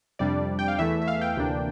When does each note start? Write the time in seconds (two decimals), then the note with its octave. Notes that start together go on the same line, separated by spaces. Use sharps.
0.19 F2 C3 G3 D4 D5
0.59 G5
0.68 F5
0.78 E2 E3 A3 E5
1.02 E5
1.08 F5
1.21 G5
1.37 D2 C3 E3 A#3 D4